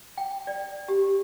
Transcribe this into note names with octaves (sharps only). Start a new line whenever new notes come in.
G5
D5
G4